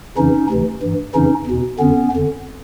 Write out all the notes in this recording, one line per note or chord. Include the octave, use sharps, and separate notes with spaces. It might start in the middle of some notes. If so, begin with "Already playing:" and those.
F2 C#3 E3 C#4 D#4
D2 C3 E3
G2 E3
F2 C#3 E3 C#4 D#4
E2 B2
F2 D3 B3 C#4
F2 D3